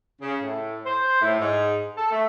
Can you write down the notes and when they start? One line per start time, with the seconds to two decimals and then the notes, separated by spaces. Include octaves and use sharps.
0.22 C#3
0.42 A2
0.86 C5
1.22 A2
1.40 G#2
1.98 A4
2.12 A3